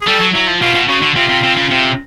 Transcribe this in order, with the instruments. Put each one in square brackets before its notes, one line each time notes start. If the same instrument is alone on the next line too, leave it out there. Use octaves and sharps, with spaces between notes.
[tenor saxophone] G#4
[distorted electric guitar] G3 [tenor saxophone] A4
[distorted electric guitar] F#3
[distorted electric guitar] F#3 [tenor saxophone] E4
[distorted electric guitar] F3
[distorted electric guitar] B2 [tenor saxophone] F4
[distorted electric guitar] B2
[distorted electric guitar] C#3 [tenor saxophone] F#4
[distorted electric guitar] D3
[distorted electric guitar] C3 [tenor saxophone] F4
[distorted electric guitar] C3
C3
C#3
C3